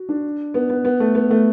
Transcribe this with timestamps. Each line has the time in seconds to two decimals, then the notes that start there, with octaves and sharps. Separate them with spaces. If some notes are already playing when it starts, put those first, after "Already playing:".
Already playing: F#4
0.09 D4
0.54 B3
0.70 B3
0.85 B3
1.00 A3
1.15 B3
1.31 A3